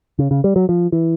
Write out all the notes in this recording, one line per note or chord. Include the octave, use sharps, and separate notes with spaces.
C#3
C#3
G3
F#3
F3
E3